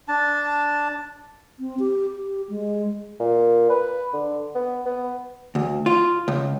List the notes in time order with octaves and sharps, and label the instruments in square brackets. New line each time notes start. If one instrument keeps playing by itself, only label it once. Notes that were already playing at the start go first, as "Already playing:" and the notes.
[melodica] D4 A5
[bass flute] C4
G4
G4
G#3
[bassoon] A#2
B4
D3
B3
B3
[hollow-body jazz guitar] D2
F4
C#2